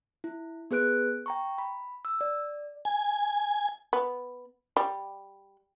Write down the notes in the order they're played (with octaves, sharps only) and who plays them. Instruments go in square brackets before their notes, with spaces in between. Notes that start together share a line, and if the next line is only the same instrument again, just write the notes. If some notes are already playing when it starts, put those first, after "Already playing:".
[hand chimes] E4
B3 G#4 B4 F#6 D7
G5 A#5 C#6
B5
E6
D5
[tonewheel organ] G#5
[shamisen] B3
G3